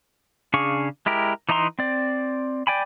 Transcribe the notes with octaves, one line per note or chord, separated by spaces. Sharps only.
C#3 D4 G#4 F5 C#6
G#3 E4 G4 A#4
E3 D#4 E4 A#5 C6
C4 D5
D5 G5 G#5 B5